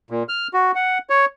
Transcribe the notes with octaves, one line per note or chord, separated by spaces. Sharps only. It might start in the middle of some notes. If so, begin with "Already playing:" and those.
A#2
F6
F#4
F#5
C#5